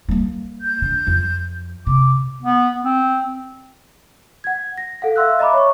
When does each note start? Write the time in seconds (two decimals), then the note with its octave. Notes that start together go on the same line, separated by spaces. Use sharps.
0.08 G3 A#3
0.61 G6
0.82 D3
1.07 F2
1.87 C3 D6
2.43 B3
2.85 C4
4.44 F#5 G#6
4.78 A#6
5.02 A4 F5 F#5
5.16 E5 F5 C6 E6 F#6
5.39 D#5 E5 A#5 B5 D6
5.53 C#5 C#6